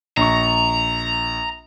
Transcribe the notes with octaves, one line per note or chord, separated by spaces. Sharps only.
A#1 A#5 C#6